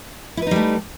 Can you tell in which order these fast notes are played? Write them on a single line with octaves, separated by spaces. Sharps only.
E4 B4 D#4 G3 A3